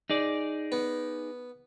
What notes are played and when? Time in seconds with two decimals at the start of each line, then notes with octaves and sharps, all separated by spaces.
0.10 D#4 G#4 D5
0.72 B3